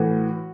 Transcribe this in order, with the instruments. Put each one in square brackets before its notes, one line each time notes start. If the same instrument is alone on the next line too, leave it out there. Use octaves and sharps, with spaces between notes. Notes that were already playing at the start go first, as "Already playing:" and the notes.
Already playing: [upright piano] A2 E3 F#4